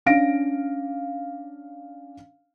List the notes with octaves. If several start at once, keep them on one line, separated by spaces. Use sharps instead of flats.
C#4 D4 F5 A#6 D7